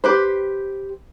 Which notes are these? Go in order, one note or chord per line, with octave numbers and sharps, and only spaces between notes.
G4 B4 C5